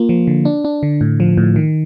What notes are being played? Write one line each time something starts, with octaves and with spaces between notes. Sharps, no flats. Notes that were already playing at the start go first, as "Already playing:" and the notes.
Already playing: A#3 F4
F3
D3
D4
D4
D3
A2
F3
A2
D#3